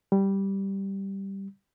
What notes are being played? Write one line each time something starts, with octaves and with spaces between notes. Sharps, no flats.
G3